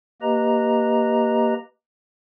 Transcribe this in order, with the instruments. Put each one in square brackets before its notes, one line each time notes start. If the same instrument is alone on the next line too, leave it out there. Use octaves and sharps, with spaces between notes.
[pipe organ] A#3 G4 B4 D#5 A#5